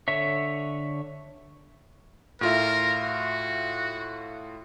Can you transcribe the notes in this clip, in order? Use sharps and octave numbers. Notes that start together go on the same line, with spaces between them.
D3 C#5 E5
A2 F4 A#4 E5
F#4